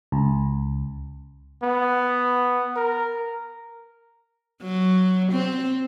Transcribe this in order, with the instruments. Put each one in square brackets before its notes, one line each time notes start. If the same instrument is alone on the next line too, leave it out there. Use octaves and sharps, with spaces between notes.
[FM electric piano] C#2
[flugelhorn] B3
A#4
[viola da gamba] F#3
C4